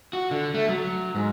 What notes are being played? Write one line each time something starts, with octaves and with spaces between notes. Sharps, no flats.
F#4
D3
A3
F#3
G#2